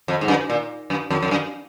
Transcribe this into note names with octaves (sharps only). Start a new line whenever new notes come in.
F2
G#2
F#2
A#2
F#2
F2
F2
F#2